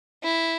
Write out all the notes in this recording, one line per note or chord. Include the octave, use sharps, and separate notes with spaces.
E4